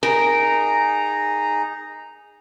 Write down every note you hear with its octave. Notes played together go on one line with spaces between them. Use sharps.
D#4 G#4 A#4 A#5